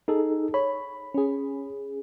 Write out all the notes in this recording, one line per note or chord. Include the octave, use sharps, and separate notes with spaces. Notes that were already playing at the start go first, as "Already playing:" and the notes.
D#4 G#4 A4
C#5 B5
C#4 G#4